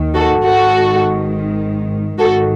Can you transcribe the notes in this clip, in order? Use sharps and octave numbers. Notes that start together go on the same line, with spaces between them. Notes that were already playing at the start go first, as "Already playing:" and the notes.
Already playing: D#2 D#3
F#4 A4
G#1 G#2 D#3 F#4 A4
G#1 G#2 D#3 F#4 A4